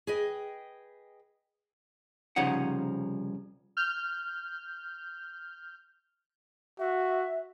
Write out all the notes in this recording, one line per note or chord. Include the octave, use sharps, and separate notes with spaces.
G#4 B4 D#5 G5
C2 C#3 F3 D#4 F#5
F6 G6
F#4 E5